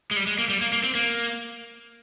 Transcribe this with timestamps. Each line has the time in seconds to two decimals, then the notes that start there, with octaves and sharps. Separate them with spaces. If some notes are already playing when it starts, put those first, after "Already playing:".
0.11 G#3
0.16 G3
0.27 G#3
0.38 A#3
0.49 G3
0.61 A#3
0.73 A#3
0.84 C4
0.95 A#3